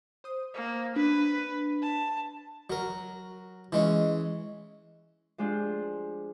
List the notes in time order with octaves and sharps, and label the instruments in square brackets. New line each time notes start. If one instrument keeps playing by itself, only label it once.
[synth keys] C5 D#6
[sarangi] A#3
[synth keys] D4 [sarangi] B4
[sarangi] A5
[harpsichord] F#3 A#4
E3 G#3 C#4
[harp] F3 G#3 D4 F4 G4